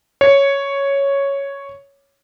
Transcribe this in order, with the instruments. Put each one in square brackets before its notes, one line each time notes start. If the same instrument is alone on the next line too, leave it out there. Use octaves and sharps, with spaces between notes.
[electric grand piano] C#5 C#7